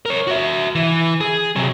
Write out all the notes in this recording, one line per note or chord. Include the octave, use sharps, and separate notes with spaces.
A#4 C#5
F#4 E5
E3
G#4
C3 F#3